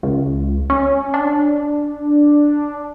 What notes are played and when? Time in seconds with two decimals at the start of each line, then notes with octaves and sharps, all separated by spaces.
0.03 C#2
0.70 C#4
1.14 D4